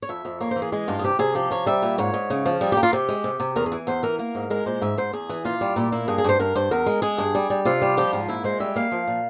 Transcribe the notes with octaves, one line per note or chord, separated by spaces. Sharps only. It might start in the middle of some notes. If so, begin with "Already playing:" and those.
C#5
F2 E5
F2
A#3 C#5
C5
E3
G#4
G#3 G#4
G2 F4
G#4
C3 G4
C3 G#4
F3 G4
C3 C#5
G3 E5
A#2
G#2 C#5
G#2
C#3
F3
G3 G#4
G4
A#3
F4
C3 G4
G#3
C3
C3
E2 A#4
G#4
E3
E2 C5
E3 A#4
A#3 A#4
G#2
G#3 A#4
A#2 C5
G#2 E5
G#2 C5
E2 G#4
E3
A#2 F4
G3
A#2 E4
A#3 E4
G2 G#4
G#4
G2 C5
G2 A#4
G2 C5
E2 A#4
G#3
G#3 G#4
G2
G3
G3
C3 F4
G3
F3 G4
G#2 F4
A#2 E4
G#3 C5
G3 E5
A#3 F5
F3
A#2